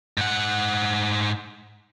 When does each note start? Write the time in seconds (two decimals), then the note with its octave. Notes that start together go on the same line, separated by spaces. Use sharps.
0.18 G#2 F#5